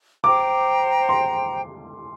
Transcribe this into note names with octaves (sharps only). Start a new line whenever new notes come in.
C5 G5 A#5 D6
C6